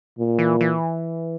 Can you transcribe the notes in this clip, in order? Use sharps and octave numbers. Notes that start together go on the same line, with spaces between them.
A#2
E3
E3